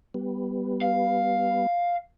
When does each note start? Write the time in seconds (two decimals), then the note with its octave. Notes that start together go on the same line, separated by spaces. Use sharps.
0.14 G3 B3
0.82 F5